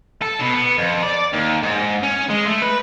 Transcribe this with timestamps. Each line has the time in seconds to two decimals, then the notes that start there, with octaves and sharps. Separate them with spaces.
0.22 A4
0.40 B2
0.54 B3
0.78 F2
1.02 D5
1.33 D#2
1.63 G#2
2.03 C#4
2.30 G#3
2.47 A3
2.62 B4